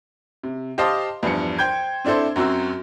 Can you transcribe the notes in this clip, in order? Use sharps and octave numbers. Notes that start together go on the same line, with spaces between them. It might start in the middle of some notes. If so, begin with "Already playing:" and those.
C3
G4 C5 D#5 F5 A5 D6
E2 G2 F3 C#7
C5 G5 G6 G#6
C4 D4 E4 A4 C5
F#2 F#3 C4 F#4 E6